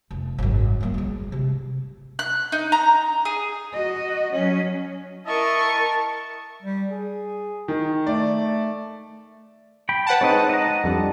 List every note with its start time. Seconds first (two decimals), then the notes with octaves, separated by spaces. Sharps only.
0.11 F1
0.38 G#1 F#2
0.81 F#3 A#3
0.94 F#3 G#3
1.32 C3
2.19 F#6
2.52 D#4
2.72 A#5
3.25 G#4
3.73 F#4 D#5
4.32 F#3 C#4
5.27 E4 A#4 D#5 E5 A5 C#6
6.63 G3
6.91 G#4
7.68 D#3
8.07 A3 D5
9.89 G5 B5
10.06 B4 F#5 A5
10.21 G#3 C4 D#4 C#5 D#5
10.49 D#5 A#5
10.84 F2 G3 D4